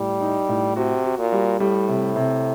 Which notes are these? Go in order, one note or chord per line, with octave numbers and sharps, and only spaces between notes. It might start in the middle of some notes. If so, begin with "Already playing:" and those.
Already playing: A2 G3
D#4
A2
C3 F#4
F#4
A#2
G3
A2 G3
C3
C3